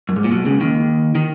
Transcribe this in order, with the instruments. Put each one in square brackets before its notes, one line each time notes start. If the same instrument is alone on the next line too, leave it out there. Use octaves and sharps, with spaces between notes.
[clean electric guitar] F#2
G#2
A#2
B1 B2
C#2 C#3
D#2 D#3
D#3